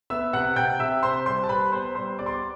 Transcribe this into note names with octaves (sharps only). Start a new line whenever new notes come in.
B3 E5 E6
C3 F#5 F#6
C3 G5 G6
C3 E5 E6
C3 C5 C6
G3 C5 C6
A5
G3 B4 B5
B3 C5 C6
G3 C5 C6
B3 D5 D6
C6
D6